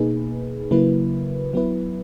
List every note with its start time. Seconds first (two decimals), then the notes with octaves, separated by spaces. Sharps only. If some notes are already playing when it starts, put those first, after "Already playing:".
Already playing: B2 A#3 D#4 G#4 B4
0.71 C#3 F#3 A#3 E4 B4
1.54 F#3 B3 E4 B4